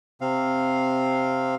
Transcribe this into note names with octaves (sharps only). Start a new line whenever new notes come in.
C3 C4 F5